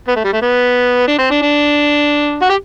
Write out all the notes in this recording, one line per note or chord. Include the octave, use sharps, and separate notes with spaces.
B3
A3
G3
A3
B3
D4
C4
D4
D4
F#4
G4